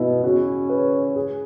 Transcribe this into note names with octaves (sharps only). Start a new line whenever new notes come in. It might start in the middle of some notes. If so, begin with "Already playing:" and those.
Already playing: B2 B3 E4
C#3 C#4 F#4
B4
G#4